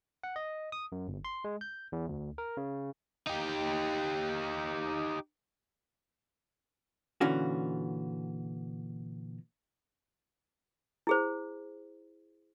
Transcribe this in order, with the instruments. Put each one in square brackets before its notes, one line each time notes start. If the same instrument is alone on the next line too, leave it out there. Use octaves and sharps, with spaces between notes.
[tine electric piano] F#5
D#5
D#6
F#2
G1
C6
G#3
G6
E2
D2
A#4
C#3
[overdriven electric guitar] D#4 G4
[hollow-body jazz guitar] A#2 D3 E3 C#4 F4 F#4
[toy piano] E4 G#4 C5